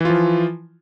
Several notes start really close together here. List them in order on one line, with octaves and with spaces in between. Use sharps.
E3 F4 F3